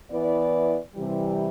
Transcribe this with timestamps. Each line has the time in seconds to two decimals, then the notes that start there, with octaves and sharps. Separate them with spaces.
0.11 E3 B3 E4 B4 D5
0.95 C3 E3 G3